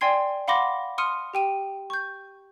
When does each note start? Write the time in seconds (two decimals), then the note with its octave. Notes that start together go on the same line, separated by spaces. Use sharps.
0.01 D5 G5 G#5 C6 G#6 C7
0.48 F5 F#5 B5 C6 D6 A#6
0.98 C6 D#6 F6 C#7 D#7
1.34 G4 G5 D#7
1.90 C#6 G6